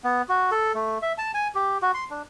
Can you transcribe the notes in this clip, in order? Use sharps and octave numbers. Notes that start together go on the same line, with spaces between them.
B3
F#4
A4
A3
E5
A5
G#5
G4
F#4
C6
D4